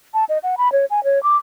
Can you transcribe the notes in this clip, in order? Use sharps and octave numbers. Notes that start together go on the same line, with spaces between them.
A5
D#5
F#5
B5
C#5
G#5
C#5
D6